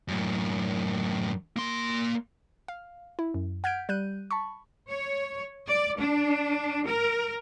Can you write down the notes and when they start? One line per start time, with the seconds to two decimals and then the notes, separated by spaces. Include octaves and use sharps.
0.08 F#2 A2
1.56 A#3 C6
2.68 F5
3.19 E4
3.34 F#2
3.64 F#5 F6 G6 G#6 B6 D7
3.89 G3 F#6 G6 D#7
4.31 A5 B5 C#6
4.88 C#5
5.67 D5
5.99 D4
6.85 A#4